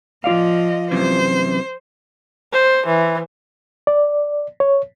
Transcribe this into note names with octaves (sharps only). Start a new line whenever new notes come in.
F3 F4 D5 D#5 F5
F#2 C3 E3 C5
C5
E3
D5
C#5